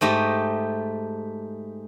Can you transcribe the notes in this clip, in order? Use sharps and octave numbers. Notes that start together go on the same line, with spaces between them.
G#2 A3 G4 D#5